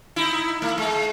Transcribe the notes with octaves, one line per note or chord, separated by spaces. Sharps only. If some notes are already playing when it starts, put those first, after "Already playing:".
D#4 E4
A3
G#3